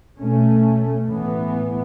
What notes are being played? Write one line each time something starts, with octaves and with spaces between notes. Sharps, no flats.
B2 A3 C#4
A2 E3 B3